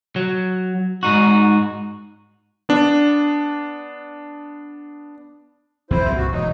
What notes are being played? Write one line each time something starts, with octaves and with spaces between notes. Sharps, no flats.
F#3
G#2 D#4 F#4
B3 D4
E2 C4 E4 C5
C2 G2 A#2
F#4
E1 E3 F#3 D#4